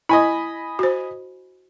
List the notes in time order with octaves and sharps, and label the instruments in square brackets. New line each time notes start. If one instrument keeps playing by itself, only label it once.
[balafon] E4 [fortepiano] D#5 G#5 B5
[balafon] F#4 C5